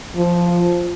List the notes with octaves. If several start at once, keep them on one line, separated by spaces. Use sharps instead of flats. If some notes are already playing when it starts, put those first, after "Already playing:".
F3